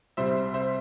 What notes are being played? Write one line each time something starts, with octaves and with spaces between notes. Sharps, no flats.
C2 C3 G3 C5 E5
C5 E5